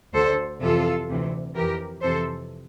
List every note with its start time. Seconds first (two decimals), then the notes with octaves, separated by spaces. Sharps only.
0.14 D2 D3 A4 C5
0.61 F2 C3 E3 F4 A4
1.08 D2 C3 E3
1.55 F2 E3 G4 A#4
2.02 F2 C3 E3 A4 C5